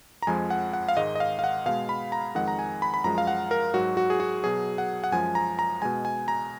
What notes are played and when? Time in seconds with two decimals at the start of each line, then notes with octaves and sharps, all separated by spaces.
0.22 A#5
0.27 F2 F3 G#3 G#5
0.50 F#5
0.73 F#5
0.88 F5
0.97 G#2 D#3 G#3 D#5
1.15 D#5
1.20 F5
1.39 F5
1.44 F#5
1.66 B2 G#3 F5
1.89 B5
2.12 A#5
2.35 F2 D#3 G#3 F#5
2.48 A#5
2.59 G#5
2.82 B5
2.94 B5
3.04 F#2 F3 G#3 A#5
3.18 F5
3.27 F#5
3.51 A#4
3.74 G#2 F#3 F#4
3.97 F#4
4.10 G#4
4.20 F#4
4.44 B2 F#3 G#4
4.78 F#5
5.04 F#5
5.12 F#2 F3 G#3 G#5
5.35 A#5
5.59 A#5
5.82 B2 G#3 G#5
6.05 G#5
6.28 A#5